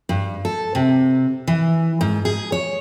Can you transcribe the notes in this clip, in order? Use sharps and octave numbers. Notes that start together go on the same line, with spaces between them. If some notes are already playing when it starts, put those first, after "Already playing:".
G2
A4
C3
E3
G#2
G#4
C#5